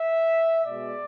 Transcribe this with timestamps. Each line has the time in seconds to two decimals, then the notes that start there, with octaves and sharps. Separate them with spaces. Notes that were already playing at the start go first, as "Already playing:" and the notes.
Already playing: E5
0.65 B2 G#3 D5